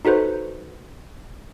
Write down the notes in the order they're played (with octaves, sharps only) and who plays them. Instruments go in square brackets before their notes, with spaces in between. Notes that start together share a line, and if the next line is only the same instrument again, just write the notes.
[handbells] D#4 F#4 A4 B4 C5